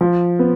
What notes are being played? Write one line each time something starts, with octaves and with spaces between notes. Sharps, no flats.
F3
B3